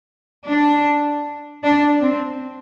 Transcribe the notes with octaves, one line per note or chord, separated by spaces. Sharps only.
D4
D4
C4